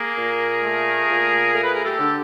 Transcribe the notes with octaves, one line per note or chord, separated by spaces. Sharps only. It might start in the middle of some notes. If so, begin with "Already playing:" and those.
Already playing: A#3 G#4 A#4
A#2
A3
A#2
A3 A#4
B4
G#4 A#4
G4 A4
D3